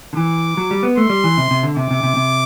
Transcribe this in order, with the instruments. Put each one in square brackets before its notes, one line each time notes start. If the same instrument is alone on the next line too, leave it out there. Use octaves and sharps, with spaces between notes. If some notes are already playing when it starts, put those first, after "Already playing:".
[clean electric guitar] D3
[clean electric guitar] E3 [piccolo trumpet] D6
[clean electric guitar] F#3
G3
B3
[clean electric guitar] A3 [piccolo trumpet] C6
[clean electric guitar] G3
E3
C3
C3
D3
[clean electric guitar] C3 [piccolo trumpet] D6
[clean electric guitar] C3
C3
C3